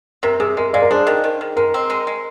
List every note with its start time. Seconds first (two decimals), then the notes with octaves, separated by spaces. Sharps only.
0.23 C3 A#4
0.40 C3 G#4
0.57 G#3 A#4
0.73 G#3 D5 F5
0.82 A#4
0.90 D4 G#4 C5
1.07 D#3
1.24 D#3
1.41 D#3
1.56 G#3 A#4
1.74 C4
1.90 G#3
2.07 G#3